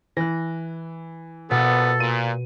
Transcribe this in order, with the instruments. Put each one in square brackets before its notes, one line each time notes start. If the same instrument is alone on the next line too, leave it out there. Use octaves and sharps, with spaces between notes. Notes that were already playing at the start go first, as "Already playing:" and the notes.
[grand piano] E3 [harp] F#6 A#6
[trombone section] A#1 B3 [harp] B2 [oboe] A4
[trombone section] A#2 [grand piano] D#7